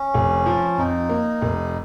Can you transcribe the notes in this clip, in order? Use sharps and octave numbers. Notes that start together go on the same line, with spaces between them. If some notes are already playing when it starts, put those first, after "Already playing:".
Already playing: C#4
F1
F3
F2 D#4
A#3
F1